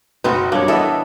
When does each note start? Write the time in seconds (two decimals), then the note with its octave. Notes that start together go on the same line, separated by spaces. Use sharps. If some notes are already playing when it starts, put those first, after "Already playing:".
0.24 F#1 B2 B3 C4 D#4 F#4 B4
0.52 F2 F#3 G3 A#3 D4 C#5
0.68 E3 B3 A4 D#5 E5